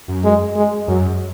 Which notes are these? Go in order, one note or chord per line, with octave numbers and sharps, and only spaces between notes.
F#2
G#3
G#3
F#2 F#3